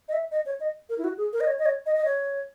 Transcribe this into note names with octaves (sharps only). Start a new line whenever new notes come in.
D#5
E5
D#5
C#5
D#5
A#4
E4
F#4
G#4
A#4
D#5
C#5
D#5
C#5
D#5
D#5
C#5